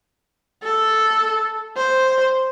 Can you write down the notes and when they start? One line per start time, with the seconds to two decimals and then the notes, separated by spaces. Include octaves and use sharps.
0.64 A4
1.77 C5